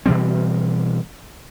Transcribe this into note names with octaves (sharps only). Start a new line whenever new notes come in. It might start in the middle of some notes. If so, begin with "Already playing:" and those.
B2 E3 G3 C4